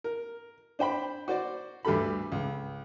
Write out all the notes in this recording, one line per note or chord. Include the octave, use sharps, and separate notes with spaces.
A#4
D4 C5 G5 B5
F#4 C5 D5
D2 G2 G4 A4 B5
C#2